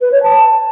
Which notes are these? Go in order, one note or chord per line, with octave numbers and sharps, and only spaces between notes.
B4
C#5
A5